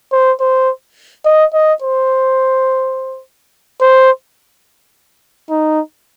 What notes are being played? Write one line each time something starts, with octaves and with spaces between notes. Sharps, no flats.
C5
C5
D#5
D#5
C5
C5
D#4